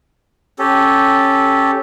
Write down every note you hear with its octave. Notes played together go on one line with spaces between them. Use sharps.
C#4 G4 A4